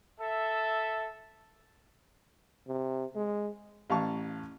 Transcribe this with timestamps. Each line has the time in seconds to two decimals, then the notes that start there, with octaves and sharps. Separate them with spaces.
0.20 A4 E5
2.68 C3
3.15 G#3
3.90 A1 F5 A5 C#6